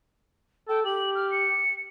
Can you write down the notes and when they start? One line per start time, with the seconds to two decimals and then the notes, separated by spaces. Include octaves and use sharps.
0.69 A4 G5
0.85 G4 F#7
1.15 F6
1.31 C#7